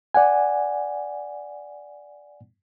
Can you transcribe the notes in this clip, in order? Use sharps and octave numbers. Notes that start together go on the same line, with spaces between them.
D5 F#5 G#5